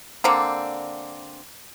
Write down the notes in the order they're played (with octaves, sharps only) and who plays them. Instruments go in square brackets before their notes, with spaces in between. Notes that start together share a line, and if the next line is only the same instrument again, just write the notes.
[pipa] D3 A#3 C4